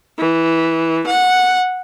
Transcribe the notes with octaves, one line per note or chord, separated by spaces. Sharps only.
E3
F#5